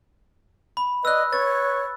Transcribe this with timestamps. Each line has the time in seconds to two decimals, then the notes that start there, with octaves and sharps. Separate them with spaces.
0.77 B5
1.05 B4 D5 D#5 E6 F#6
1.33 B4 C#5 A6